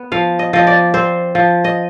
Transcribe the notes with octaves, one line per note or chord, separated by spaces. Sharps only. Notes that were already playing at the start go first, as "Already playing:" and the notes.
Already playing: B3
F3 F5
D#5
F3 D#5
D5
C4 C5
F3
D#5